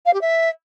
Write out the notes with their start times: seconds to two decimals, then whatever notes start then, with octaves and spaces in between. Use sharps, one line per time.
0.05 F5
0.13 G4
0.21 E5